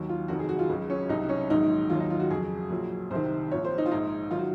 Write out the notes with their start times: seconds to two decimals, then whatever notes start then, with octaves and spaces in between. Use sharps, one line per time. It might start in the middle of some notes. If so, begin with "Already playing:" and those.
Already playing: D#2 D#3 F#3
0.09 F4
0.28 F1 F2 D#3 F#3 F#4
0.39 G#4
0.49 F#4
0.59 F4
0.70 C#2 C#3 F#3
0.90 C#4
1.09 C2 C3 F#3 D#4
1.29 C#4
1.50 A#1 G#2 D#3 F#3 D#4
1.90 D#2 D#3 F#3 F4
2.00 D#4
2.10 F4
2.20 F#4
2.30 F2 C#3 F#3 G#4
2.70 A#1 A#2 F#3
3.10 C2 C3 D#3 C5
3.51 C2 A#2 F3 C#5
3.65 C5
3.78 D#4
3.86 F4
3.91 A#1 G#2 F3 D#4
4.31 D#3 F#3 F4
4.39 F#4